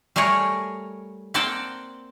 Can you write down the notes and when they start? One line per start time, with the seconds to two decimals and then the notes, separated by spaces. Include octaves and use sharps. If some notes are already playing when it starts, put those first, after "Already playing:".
0.16 G3 A3 G#4 A#4 C#5
1.34 A#3 C4 D5 F#5 G5 A5